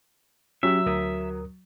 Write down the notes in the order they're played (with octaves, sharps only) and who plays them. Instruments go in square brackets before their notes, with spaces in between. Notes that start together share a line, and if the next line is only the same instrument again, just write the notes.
[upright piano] F#3 [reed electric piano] C#4 G4 E6 [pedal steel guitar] E5
[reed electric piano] D2 A#4 D#6